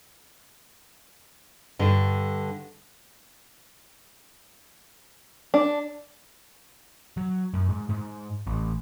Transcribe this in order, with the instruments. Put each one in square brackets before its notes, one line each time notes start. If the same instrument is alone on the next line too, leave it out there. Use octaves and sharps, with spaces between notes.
[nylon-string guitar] G2 D3
[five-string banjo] D4
[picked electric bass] F#3
F#2
G#2
G#2
A1